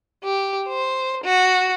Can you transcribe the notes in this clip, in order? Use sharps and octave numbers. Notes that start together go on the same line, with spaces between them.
G4
C5
F#4